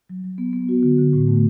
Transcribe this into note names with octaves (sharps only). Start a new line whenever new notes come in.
F#3
F#3
B3
B3
F#4
D3
D3
A2
A3